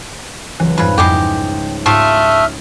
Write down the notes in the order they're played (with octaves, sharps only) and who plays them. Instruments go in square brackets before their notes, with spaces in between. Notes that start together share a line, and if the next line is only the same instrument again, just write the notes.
[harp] C#2 F#3 B4 [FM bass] E3
[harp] F2 G#2 G3 [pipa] C#3 B4
[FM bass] F2 [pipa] G#3 B3 G4 [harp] E4 G#4 D#5
[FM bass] G#2 [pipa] A3 F4 G4 [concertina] E5 D#6 F6